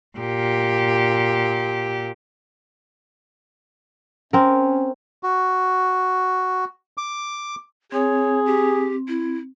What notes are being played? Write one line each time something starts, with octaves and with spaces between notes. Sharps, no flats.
A#2 G4
C4 C#4 A#4
F#4
D6
C4 G#4 C#5
G4
E4